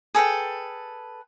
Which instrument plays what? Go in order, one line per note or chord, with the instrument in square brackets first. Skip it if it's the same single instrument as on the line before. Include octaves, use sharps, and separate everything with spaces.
[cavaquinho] G#4 A4 B4 G5